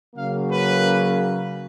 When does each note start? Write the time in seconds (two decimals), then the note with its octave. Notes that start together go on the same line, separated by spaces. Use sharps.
0.15 C#3 F#3 A#3 F5
0.49 B4